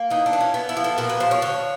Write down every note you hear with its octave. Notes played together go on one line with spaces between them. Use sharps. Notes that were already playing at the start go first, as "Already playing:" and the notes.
Already playing: A#3
E3 D#4
D4
E3
C#4
B3
E4
F3
A4
A#2 A#4
B4
F3 C5
C#5
D3 C#5